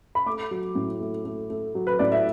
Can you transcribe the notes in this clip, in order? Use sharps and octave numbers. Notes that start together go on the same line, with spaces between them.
B5
A3 D6
F#3
A2
A3
A3
A3
F#3
B4
A2 D5
E5